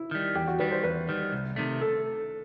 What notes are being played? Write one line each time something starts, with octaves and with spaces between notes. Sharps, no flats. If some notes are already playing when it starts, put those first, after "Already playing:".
Already playing: E4
D#3 G3
E2 G4
F#4
D#3 G3 B4
C5
E2 B4
D#3 G3
C2
C3 D#3 A3
A4